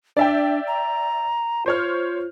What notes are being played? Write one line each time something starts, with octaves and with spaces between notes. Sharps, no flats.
D4 D5 E5 G5
A#5
F4 C5 C#5 F6